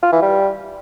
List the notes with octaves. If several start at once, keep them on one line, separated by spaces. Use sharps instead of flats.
F4
E3
G3